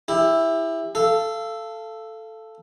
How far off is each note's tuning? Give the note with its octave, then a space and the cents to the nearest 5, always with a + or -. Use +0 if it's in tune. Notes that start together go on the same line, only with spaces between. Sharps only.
E4 +0 G4 +35
A4 +0 F5 -25